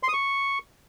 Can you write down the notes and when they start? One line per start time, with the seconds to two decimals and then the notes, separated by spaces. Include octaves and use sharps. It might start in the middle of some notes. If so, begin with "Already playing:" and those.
0.03 C6
0.08 D#6
0.13 C#6